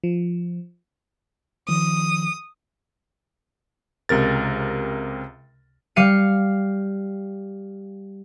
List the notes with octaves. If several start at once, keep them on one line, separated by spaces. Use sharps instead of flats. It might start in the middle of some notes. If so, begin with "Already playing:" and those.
F3
D#3 F3 D#6
C#2 C3 A#4 A6
G3 F5 C#7 D#7